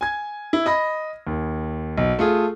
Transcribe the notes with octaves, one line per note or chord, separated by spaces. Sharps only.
G#5 G#6
E4
D#5 B5 A#6
D#2
B1
A3 F4 G#4